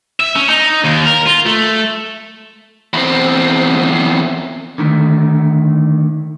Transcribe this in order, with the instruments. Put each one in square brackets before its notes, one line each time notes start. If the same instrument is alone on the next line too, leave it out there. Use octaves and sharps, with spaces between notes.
[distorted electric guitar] E5
C#4
D#4
D#2
A#4
F4
A3
[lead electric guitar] E2 C4
[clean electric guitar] D3 D#3 A3